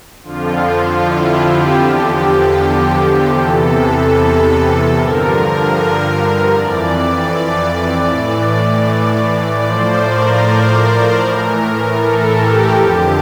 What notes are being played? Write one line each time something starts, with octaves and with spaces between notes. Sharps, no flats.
F2 D3 F3 F4
E4
G4
E2 D3 F3
E2 C3 E3 A4
G2 D3 F3 A#4
F2 E3 D5
A2 E3
A2 F3 C5
A#4
A2 E3
A4
G4
F2 D3 F3